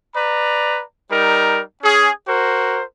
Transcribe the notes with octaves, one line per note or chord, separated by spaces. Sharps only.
B4 D5 A#5
G3 D#4 A#4
C#4 G#4
F#4 A#4 C5